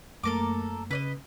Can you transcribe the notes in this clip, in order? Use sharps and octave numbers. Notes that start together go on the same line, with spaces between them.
F#2 A3 A#3 A4 A#4 D6
C#3 B4 D5 D#5